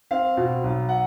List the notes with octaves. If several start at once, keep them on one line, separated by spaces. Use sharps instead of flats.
C4 F5
B2
B1
F#5